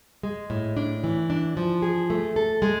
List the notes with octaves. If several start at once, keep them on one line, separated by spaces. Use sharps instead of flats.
G#3
A2
D4
E3
D4
F3
G#4
A3
A4
G#3